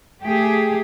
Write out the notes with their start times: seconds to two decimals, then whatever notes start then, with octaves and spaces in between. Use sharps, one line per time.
0.23 A3 G4 G#4